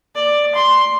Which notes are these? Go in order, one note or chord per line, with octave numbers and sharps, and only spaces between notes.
D5
C6